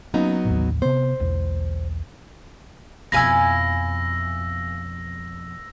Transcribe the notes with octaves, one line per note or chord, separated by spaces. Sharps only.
F#3 A#3 B3 C#4 D#4
A1 D#2
C3 B3 C5
B1 E2
F2 B2 E4 F5 G#5 E6 A#6